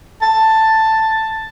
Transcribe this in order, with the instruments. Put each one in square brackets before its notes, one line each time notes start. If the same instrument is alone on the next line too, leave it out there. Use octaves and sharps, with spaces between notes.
[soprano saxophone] A5